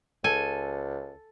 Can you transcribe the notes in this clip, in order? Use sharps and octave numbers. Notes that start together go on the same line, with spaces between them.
C#2 A4 G#5